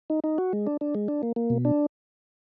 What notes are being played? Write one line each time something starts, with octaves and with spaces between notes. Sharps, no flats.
D#4
D#4
F#4
G#3
D4
D4
G#3
D4
A#3
A#3
B2
D4